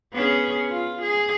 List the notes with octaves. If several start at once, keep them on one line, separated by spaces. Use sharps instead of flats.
B3 C#4 G#4
F4
G#4